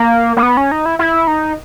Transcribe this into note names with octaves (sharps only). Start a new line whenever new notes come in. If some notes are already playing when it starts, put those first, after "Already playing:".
Already playing: A#3
A#3
B3
C#4
D#4
E4
E4
D#4